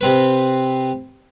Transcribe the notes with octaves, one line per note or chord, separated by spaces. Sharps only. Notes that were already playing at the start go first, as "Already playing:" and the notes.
C3 C4 B4